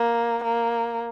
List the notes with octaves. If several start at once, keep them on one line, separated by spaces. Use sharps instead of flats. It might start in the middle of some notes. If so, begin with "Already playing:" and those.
Already playing: A#3
A#3